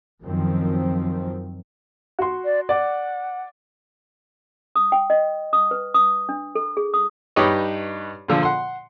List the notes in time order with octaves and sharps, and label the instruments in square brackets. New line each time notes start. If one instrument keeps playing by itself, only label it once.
[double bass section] F#2 D#3 F3 C4
[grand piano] F#4 C6
[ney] D5
[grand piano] D5 [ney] F#5
[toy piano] D#6
G5
D#5
D#6
B4
D#6
D4
A4
G#4
D#6
[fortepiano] G2 D#4 G4 B4 C#5 D#5
A#2 D3 F3
F#5 C6